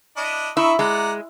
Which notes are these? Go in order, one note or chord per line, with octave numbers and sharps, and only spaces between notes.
D4 E4 D#5
D#4 E4 C#6 E6
G#3 D5 F#5 A#5